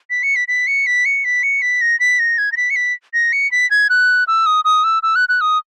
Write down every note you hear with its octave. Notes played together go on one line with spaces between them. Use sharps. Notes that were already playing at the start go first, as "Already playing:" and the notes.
B6
C#7
B6
B6
C#7
B6
C#7
B6
C#7
B6
A#6
B6
A#6
G#6
A#6
B6
C#7
B6
A#6
C#7
B6
G#6
F#6
E6
D#6
D#6
E6
E6
F#6
F#6
D#6